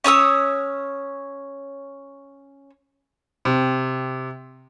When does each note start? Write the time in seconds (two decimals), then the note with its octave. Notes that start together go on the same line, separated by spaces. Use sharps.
0.04 C#4 C#5 D#6 E6
3.45 C3